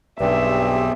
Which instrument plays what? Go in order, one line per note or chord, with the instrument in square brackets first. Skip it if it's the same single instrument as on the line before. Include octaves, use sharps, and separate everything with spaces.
[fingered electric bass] B1 [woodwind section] G2 [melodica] C4 G4 G#4 [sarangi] E5